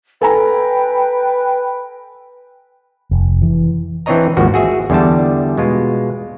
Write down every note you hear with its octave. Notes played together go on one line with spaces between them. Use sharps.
A4 B4 G5 G#5 A#5
F1
E3
E3 C4 D4 C#5 D#5 A#5
G#1 D#2 F3 F#4
F#4 G#4 E5
E2 D3 G3 A5
B2 G#3 F4